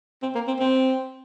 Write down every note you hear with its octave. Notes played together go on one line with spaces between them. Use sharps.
C4
A#3
C4
C4